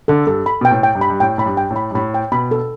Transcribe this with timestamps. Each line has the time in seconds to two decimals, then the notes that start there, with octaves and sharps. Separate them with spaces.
0.08 D3 A4
0.27 G2 A4
0.46 B5
0.61 B2 G5
0.71 A2
0.83 G5
0.95 G2
1.01 B5
1.10 G2
1.20 A2 G5
1.38 A2 B5
1.46 G2
1.57 G5
1.71 A2
1.76 B5
1.91 G2
1.95 A2 B5
2.14 G5
2.32 B2 B5
2.51 A4